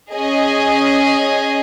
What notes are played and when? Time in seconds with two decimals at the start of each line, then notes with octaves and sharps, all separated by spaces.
0.13 C#4 G#4 D#5 G#5